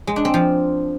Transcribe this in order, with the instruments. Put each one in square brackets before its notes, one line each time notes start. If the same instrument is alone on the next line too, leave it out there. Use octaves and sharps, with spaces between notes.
[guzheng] G#3
D4
C4
F3